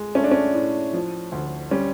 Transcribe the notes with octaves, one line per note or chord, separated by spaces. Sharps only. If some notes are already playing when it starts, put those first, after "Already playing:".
Already playing: G#3
A3 C#4
D4
C#4
A2
F3
D2
G3 C#4